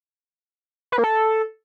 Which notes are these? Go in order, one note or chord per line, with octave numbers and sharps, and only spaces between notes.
B4
A#3
A4